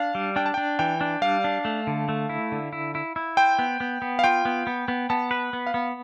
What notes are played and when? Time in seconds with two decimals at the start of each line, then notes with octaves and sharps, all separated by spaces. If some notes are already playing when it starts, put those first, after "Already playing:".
Already playing: D4 F5
0.15 G3
0.36 D4 G5
0.46 A5
0.54 D4 G5
0.79 E3 G5
1.01 D4
1.22 G3 F5
1.44 D4
1.65 A3
1.87 D3
2.09 A3
2.29 E4
2.52 D3
2.73 E4
2.95 E4
3.16 E4
3.37 C5 G5
3.59 B3
3.80 B3
4.02 B3
4.19 F5
4.24 F4 G5
4.45 B3
4.67 B3
4.88 B3
5.10 B3 A5
5.31 B4
5.53 B3
5.67 F5
5.74 B3